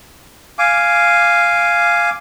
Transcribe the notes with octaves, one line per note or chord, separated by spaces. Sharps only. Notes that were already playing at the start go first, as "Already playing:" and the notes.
F5 G#5 D6